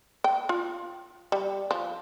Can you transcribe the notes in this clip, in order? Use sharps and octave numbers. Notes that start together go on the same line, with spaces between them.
G5
F4
G3
F3